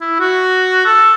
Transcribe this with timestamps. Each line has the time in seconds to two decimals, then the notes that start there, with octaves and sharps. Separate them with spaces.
0.01 E4
0.19 F#4
0.85 A4